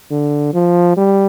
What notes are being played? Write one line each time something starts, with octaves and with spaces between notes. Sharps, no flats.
D3
F3
G3